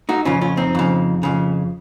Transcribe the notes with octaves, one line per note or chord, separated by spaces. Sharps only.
D#4 F#4
F2 C#3 C#4 F4
C#4 F4
C4 D#4
F2 C#3
F2 C#3